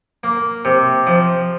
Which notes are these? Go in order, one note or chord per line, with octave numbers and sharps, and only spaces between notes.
A#3
C3
F3